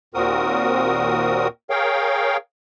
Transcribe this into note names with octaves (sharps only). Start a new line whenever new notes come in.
D#2 A#2 C4 F#4 A#4 D#6
G#4 A#4 C#5 F5 G5